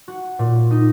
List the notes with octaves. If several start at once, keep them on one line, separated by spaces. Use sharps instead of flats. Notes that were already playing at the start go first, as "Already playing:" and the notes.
F#4
A#2
D#4